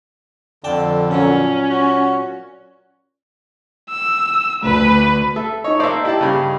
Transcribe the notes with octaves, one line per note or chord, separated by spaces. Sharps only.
F2 D3 D5 G5 A5
A#2 F#3 C#4
F#4
E6
D2 B4
A4 E5
D#4 C#5 D#5
A#3 D4 C5 D5 E5
E4 G4 A5
G2 C#3